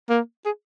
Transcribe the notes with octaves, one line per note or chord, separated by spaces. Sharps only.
A#3
G#4